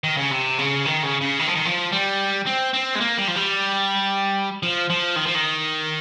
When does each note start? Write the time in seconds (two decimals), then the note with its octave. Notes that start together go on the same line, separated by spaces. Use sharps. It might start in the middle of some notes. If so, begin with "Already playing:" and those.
0.04 D#3
0.17 C#3
0.31 C3
0.58 C#3
0.85 D#3
1.03 C#3
1.21 C#3
1.39 D#3
1.47 F3
1.55 D#3
1.66 F3
1.92 G3
2.47 C4
2.74 C4
2.95 G#3
3.01 A#3
3.18 G3
3.28 F3
3.36 G3
4.63 F3
4.90 F3
5.16 D#3
5.26 F3
5.35 D#3